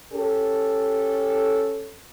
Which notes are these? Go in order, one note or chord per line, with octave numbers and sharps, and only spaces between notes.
C#4 G4 A4